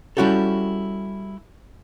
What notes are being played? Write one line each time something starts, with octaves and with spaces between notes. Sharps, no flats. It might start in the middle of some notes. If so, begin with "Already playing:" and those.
G3 C#4 E4 F#4 G4 A4